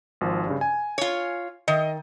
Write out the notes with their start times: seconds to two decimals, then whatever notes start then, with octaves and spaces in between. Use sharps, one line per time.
0.21 G#1 F3
0.47 G2 C#3
0.61 G#5
0.98 F4 C#5
1.68 D#3 D#5 E5